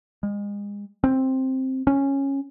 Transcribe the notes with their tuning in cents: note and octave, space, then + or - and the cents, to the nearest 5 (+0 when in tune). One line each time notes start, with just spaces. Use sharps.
G#3 -35
C4 +5
C#4 -10